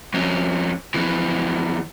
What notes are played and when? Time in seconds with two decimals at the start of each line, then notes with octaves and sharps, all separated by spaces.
0.14 F2 C#4
0.94 F2 E3